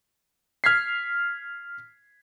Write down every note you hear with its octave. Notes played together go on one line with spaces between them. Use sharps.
F6 G#6 B6 C7